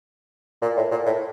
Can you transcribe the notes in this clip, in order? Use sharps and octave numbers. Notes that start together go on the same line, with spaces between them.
A#2
A2
A#2
A2